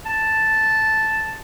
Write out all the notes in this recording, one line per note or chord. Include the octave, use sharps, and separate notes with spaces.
A5